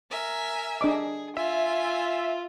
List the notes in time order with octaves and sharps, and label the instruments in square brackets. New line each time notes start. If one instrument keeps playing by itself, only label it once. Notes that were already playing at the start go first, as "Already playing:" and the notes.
[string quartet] A#4 E5 G#5
[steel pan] D4 D#5 D6 [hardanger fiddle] G#4
[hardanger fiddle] F4 [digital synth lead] E5 [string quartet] G#5